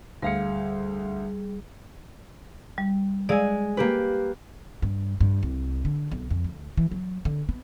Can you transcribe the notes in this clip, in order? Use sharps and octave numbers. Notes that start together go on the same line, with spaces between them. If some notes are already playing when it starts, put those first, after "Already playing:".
D2 G3 G#4 F5 C#7
G3
G#3 D5 F5 G#5 E6
A#3 G4 B4
G2
G2
C2
D3
B1
F2
D2
E3
F#3
D3
B3